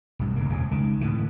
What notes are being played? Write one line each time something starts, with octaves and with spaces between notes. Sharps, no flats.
B1 G2
D1 C#3 A#3
D#1 F2 C#3
C#2 D#3
A2 D3 E3